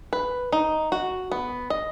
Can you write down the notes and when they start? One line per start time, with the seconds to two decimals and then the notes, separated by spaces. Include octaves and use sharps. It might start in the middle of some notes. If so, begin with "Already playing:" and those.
0.13 B4
0.52 D#4
0.92 F#4
1.32 B3
1.70 D#5